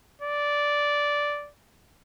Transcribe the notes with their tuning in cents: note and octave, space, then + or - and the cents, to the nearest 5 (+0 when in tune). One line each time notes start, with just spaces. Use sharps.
D5 -10